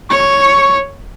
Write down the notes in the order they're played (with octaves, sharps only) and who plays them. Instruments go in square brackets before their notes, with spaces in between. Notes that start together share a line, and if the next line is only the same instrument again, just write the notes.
[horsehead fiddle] C#5 [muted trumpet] C#6